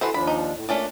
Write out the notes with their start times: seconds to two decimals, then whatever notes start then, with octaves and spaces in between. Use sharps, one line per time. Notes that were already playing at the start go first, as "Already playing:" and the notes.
0.01 E3 F#4 A4 C5
0.14 D#2 F3 D4 B5
0.27 D#4
0.55 A2
0.69 A#2 A3 C#4 D4 D5